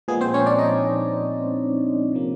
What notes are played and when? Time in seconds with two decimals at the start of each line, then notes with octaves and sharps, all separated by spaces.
0.08 A#2 F3 G#3 B3 G#4
0.21 C4 C5
0.34 C#4 C#5
0.46 D4 D5
0.59 D#4 D#5
2.13 C3 F3 A#3